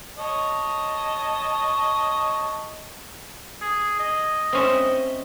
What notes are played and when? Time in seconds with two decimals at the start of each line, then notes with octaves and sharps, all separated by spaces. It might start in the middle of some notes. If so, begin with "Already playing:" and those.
0.18 C#5 D#5 A5
3.62 G#4
4.00 D#5
4.53 C4 C#4 E5